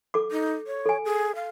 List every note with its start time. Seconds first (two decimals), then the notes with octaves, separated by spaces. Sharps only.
0.14 A4 D6
0.32 D#4
0.67 C#5
0.86 A4 G#5
1.05 G#4
1.35 F5